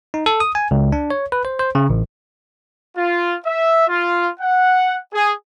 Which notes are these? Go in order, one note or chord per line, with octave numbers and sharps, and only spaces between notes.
D#4
A4
D#6
G#5
C#2
D4
C#5
B4
C5
C5
C#3
A1
F4
E5
F4
F#5
G#4